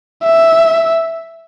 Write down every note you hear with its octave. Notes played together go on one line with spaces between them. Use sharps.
E5